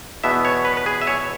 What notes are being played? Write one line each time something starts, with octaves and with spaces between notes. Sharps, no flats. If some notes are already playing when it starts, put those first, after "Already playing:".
E2 B2 B3 E5
C#5
B4
B4
G#4
E5
C#5